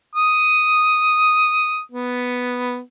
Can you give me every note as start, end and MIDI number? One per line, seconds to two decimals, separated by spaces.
0.15 1.80 87
1.92 2.79 59